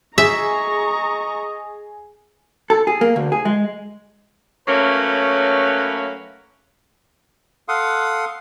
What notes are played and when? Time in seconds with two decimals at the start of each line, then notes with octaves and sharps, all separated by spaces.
0.18 G#4 D#5 E5 A#5 C#6
2.70 A4
2.87 G#4
3.01 A#3
3.16 D2
3.32 G#4
3.45 G#3
4.68 F#3 A3 A#3 C#4 B4
7.68 A4 F5 F#5 C6 D#6